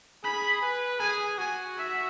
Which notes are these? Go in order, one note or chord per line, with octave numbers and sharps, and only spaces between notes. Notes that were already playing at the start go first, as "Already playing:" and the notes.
G#4 B5
B4
G#4 G#5
F#4 G#5
E5